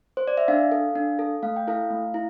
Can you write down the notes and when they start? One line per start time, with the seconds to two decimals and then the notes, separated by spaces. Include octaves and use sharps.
0.17 C5
0.27 D5
0.37 E5
0.48 D4 F5
0.72 A4
0.95 D4
1.19 A4
1.43 A3 F5
1.56 G5
1.67 E4 A4 F5
1.90 A3
2.14 E4